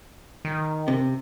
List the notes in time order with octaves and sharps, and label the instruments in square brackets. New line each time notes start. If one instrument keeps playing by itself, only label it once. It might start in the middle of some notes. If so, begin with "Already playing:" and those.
[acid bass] D#3
[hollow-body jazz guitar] C3